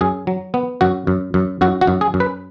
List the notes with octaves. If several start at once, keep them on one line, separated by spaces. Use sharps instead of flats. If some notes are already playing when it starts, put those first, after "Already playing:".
F#2 G#4
F#3
B3
F#2 F#4
F#2
F#2
F#2 F#4
F#4
F#2
G#4
F#2
B4